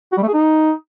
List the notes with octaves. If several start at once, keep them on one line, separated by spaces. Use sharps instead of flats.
F#4
G3
A3
G#4
D#4